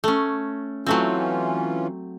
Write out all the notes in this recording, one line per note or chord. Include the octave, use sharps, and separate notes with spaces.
A3 C#4
E3 F#3 A3 C4 C#4 F4